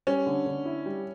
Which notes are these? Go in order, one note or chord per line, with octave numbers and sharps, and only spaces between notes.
G3 C#4
D3
D3
E4
G3